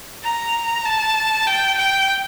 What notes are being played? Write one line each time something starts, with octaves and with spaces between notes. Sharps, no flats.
A#5
A5
G5
G5